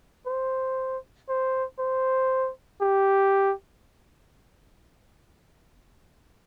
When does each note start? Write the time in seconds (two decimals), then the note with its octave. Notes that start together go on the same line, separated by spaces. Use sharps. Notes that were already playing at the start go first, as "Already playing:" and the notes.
0.27 C5
1.29 C5
1.79 C5
2.82 G4